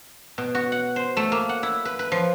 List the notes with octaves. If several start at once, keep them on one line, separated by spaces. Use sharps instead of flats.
B2
F#4
F#5
C5
A3
A#3
F#5
E4
B4
B4
F3